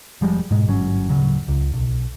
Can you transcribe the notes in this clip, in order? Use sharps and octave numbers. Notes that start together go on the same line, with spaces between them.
F1 F3 G3 G#3
G#2 B2 G#3
G1 F#3 C#4
D1 C#3 F#3
C#2
B1